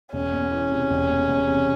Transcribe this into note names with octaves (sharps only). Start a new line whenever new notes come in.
E1 C#4
E2
E3
C3
E1
E2
E1
C3